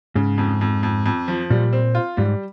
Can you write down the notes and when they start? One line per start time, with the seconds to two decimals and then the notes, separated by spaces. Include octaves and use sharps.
0.15 G#2 C#3
0.38 F2
0.61 F2
0.83 F2
1.06 F2
1.28 F3
1.50 A#2 G3
1.73 C4
1.95 F4
2.17 G#2 G3